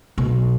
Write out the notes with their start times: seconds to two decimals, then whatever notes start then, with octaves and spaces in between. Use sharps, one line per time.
0.18 B1